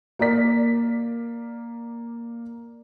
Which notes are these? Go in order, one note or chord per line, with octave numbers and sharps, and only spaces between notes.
A#3 A#4 D5 B6